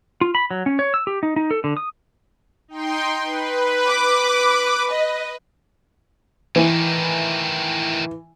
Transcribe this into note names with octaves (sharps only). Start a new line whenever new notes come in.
F4
B5
F#3
C#4
C#5
E6
G4
D#4
D#4
A4
D3
D#6
D#4 G5 C6
B4
D6
D#5
A2 D#3 E3